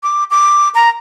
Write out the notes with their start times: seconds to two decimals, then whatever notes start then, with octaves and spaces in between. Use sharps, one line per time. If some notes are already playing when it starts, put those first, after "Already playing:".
0.03 D6
0.31 D6
0.75 A#5